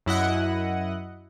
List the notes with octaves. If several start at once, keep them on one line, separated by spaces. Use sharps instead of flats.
F#2 E4 D#5 F#5